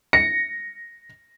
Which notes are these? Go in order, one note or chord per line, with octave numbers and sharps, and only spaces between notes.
A#6 C#7